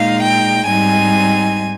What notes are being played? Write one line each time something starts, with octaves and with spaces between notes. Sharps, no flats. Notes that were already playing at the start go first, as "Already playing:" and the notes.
Already playing: A#2 G#3 D#4 F5
G5
G#2 G3 C4 D#4 G#5